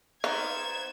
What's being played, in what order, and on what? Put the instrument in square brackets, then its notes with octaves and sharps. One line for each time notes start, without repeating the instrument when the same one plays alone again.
[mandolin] B3 D#4 C5 [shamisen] F5 [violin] G#6 E7